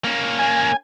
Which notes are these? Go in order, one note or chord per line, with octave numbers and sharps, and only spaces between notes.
A#3 C#4
G#5